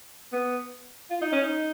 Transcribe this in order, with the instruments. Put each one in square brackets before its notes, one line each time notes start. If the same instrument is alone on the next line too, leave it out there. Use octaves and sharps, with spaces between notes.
[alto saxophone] B3
F4
D#4
C#4
D#4